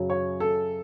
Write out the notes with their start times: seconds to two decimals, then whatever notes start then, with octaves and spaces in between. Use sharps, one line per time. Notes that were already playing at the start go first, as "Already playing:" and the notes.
Already playing: F#2 C#3 F#3
0.10 C#5
0.40 A4